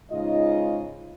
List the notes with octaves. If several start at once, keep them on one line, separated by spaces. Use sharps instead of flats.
G#2 C#3 F4 D#5